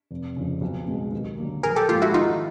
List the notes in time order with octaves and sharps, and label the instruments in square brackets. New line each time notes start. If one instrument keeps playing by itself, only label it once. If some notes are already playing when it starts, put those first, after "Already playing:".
[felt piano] F1
F2 C#3
B1
B2 G#3
D#2
D3 F#3 A#3
[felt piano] A#1 [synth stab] G#4 A#4
[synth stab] G4 A4
[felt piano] G#2 F3 A#3 [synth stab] F4 G4
[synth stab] E4 F#4
[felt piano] D#3 [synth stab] D#4 F4